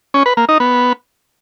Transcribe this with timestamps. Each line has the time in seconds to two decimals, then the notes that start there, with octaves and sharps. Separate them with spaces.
0.14 C#4
0.26 B4
0.37 A#3
0.49 D#4
0.60 B3